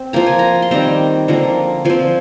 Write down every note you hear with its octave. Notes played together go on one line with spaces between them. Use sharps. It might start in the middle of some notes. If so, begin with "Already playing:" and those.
Already playing: C4
F3 A#3 A#5
G#5
A#5
C6
D#3 G3 C4 A#5
D3 F3 A#3 A#5
F3 C4 G#5